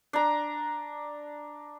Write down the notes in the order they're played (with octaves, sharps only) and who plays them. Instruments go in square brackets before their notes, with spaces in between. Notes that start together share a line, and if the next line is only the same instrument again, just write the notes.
[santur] D4 A#5